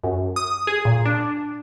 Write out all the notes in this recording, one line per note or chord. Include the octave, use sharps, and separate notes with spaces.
F#2
D#6
G#4
A#2
D4